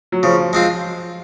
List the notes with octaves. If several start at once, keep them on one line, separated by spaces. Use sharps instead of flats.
F#3
C#3 F3
G#3 C4 F4